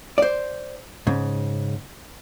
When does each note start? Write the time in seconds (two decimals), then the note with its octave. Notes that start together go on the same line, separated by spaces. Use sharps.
0.18 C5 D5
1.07 G#2 C#3